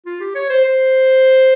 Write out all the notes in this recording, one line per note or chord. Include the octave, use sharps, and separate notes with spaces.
F4
G4
C#5
C5
C5